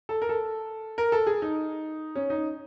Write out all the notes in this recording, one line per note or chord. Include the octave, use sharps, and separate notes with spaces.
A4
A#4
A4
A#4
A4
G#4
D#4
C#4
D#4